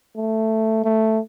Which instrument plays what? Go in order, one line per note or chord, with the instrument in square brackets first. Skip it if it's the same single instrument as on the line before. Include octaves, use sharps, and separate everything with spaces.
[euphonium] A3
A3